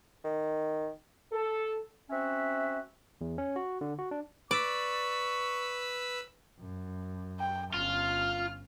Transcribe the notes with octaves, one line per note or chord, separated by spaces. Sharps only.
D#3
A4
C4 C#4 F#4 E5
E2
C#4
F#4
D3
F#4
D4
B4 D5 C#6 E6 B6
F#2
G5
G1 C#4 F4 F6